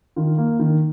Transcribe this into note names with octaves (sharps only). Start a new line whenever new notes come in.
D#3 F4
A#3
D#3